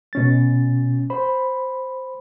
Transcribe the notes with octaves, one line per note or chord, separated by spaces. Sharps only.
B2 C#4 A6
C5 B5